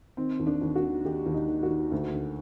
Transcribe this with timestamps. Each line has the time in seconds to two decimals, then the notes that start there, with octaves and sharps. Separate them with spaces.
0.17 D#3 C4
0.39 D#2
0.47 D4
0.61 D#2
0.76 F#4
0.83 D#3
1.04 D#3 G4
1.26 D#2
1.34 D#4
1.48 D#3
1.63 F#4
1.70 D#3
1.92 D2
2.14 D3